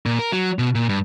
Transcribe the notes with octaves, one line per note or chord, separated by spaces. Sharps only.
A#2
A#4
F#3
B2
A#2
G2